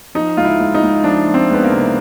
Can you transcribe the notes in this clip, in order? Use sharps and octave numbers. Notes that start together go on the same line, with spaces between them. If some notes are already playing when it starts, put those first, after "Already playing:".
F3 D#4
C#2 F4
E4
C#2
D#4
C#2
F3 D4
F3
C4
C#2 B3
A#3
C3